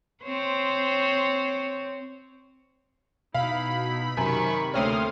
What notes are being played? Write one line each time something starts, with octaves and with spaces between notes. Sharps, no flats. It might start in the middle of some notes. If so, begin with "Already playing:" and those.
C4 C5 C#5
B2 D#4 E4 F5 B5
F#2 C3 D#3 C#6
D2 A#3 C4 A4 C#5 C6 D#6 F6